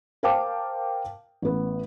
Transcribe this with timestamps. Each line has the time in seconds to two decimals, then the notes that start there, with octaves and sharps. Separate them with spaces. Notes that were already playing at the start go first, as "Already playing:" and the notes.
0.23 A#4 C5 F5 G5 A5 D6
1.42 A1 B3